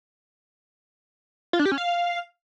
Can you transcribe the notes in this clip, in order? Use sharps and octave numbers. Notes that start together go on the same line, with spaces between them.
F4
D4
G4
C#4
F5